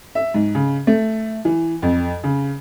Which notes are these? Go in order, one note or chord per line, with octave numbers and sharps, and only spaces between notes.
E5
G#2
C#3
A3
E3
F2
C#3